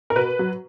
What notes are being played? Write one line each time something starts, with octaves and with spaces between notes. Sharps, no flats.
A#4
B2 B4
F#3